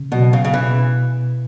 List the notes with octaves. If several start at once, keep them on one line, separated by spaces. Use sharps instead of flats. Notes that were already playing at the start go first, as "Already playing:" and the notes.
Already playing: C#3
B2 F#3 B3
C#3
C#3
B2 E3